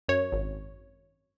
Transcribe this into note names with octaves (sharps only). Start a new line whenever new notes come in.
F#2 C#5
G#1